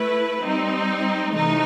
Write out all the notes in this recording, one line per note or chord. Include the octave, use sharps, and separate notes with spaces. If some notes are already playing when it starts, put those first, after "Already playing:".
Already playing: A3 E4 B4
G3 C4 D#4
C3 E3 A3 D#4